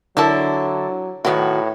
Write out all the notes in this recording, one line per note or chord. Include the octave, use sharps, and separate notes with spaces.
D3 F#3 E4 F#4 A4 A#4 A5
A2 D#3 F#3 B3 E4 F#4